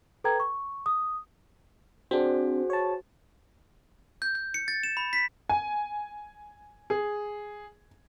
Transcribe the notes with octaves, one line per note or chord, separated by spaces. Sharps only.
A4 B4 G5 A#5 G#6
C#6
D#6
C4 D4 F#4 G#4 C5
C#5 A5
G6
G6
C#7
A6
E7
B5
B6
G#5
G#4